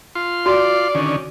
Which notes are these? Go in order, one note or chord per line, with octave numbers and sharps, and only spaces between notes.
F4 C6
F#4 D5
D3 D#3 C#4